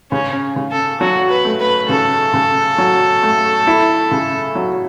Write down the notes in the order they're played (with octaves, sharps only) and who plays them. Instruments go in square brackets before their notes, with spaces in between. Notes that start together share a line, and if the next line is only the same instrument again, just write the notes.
[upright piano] C#3 [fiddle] C#4
[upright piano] C#3
[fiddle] A4
[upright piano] F#3 [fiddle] F#4
[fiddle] B4
[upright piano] A3
[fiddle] B4
[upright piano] C#3 [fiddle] A4
[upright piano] C#3
F#3
A3
E4
C#3
F#3